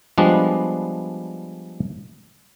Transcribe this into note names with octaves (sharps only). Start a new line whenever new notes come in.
F3 G3 G#3 B3 D4